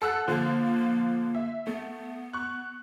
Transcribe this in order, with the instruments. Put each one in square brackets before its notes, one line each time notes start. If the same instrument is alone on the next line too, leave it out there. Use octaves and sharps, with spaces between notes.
[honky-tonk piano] A4 E6 F#6 [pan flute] F#5
[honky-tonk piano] D3 F3 [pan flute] A#3
[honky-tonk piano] E5
[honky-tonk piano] A3 [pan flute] B3
[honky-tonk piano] C#6 F#6